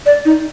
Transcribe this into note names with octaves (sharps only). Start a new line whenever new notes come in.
D5
D#4